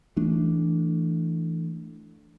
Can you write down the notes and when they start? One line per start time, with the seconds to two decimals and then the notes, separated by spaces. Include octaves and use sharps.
0.16 E3 A3 D4